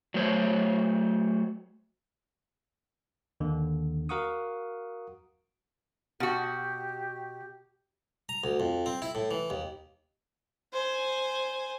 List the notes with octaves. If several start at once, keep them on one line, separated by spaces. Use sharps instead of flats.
F#3 A3 C5 C#5
D#2 D3
F#4 A#4 F5 F#5 C#6 D#6
B2 F#4 G4
A#5
D2
F2
C4
E4
A2
E3
D#2
C5 G#5